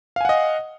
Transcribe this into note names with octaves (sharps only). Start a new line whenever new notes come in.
D#5 F5 F#5 G#5